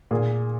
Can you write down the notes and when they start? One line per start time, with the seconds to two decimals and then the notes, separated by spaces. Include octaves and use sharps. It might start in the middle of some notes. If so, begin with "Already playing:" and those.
0.11 A#2 G#4